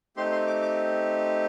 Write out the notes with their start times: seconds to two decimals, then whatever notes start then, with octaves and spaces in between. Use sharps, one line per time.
0.17 A3 C4 D#4 G4 C6
0.32 C6
0.47 D6
0.62 D6